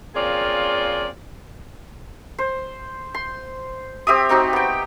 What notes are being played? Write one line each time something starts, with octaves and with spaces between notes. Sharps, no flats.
A#3 C4 C#4 F4 G#4 D5
C5
C6
C4 G4 E5 D#6
C4 D#4 F#4 G4
B3 G5